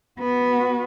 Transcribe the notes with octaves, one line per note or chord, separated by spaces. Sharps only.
B3 F#4